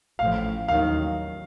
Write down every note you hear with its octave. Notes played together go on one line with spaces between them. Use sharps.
A1 A2 F3 F5
D#2 D#3 F#3 F5